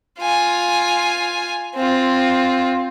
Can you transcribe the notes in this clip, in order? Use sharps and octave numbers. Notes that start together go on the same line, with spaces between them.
F4 G#5
C4 F4